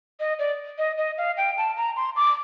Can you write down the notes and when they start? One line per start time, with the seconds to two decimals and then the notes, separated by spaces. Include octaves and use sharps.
0.20 D#5
0.39 D5
0.78 D#5
0.98 D#5
1.18 F5
1.37 G5
1.58 A5
1.77 A#5
1.96 C6
2.16 D6